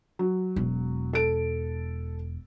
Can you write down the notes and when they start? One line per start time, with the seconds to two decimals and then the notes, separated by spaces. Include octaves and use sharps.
0.19 F#3
0.56 E1
1.13 A4 D7